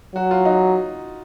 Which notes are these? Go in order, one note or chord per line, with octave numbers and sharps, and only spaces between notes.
F#3 F#4
F4
D#4